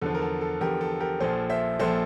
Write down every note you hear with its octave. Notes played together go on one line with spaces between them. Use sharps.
E2 D3 F3 A4
A#4
A4
A4
E2 D3 F3 G4 A#4
A4
G4 A#4
A#1 A#2 F3 A4 C5
C5 E5
A#1 A#2 F3 A4 C5